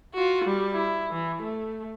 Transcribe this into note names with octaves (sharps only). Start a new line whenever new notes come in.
F4 F#4
G3
E4
E3
A3